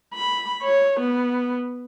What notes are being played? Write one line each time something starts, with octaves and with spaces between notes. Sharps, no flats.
B5
C#5
B3